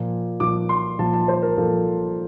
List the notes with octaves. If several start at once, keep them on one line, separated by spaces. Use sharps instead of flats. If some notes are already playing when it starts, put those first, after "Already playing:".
Already playing: A#2 F3
A#2 F3 D6
C6
A#2 F3 A5
A5
C5
A#4
A#2 F3 A4